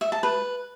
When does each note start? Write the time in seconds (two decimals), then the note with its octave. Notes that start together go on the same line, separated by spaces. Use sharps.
0.01 E5
0.12 A5
0.23 B4